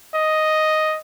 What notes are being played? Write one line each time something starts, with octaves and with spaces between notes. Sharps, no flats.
D#5